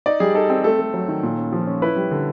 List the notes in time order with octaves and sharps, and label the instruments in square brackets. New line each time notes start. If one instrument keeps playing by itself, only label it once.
[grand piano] D#4 D5
G3 G#4
D#4 A4
C4 G#4
A3 A4
A3
F#3
D#3
A#2
C#4
F3
C#4
E4 B4
G3
D3